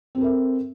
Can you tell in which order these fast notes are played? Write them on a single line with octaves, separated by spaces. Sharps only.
C4 A4 A#4 E5